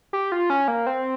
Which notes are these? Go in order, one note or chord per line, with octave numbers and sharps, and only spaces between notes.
G4
F4
C#4
A#3
C4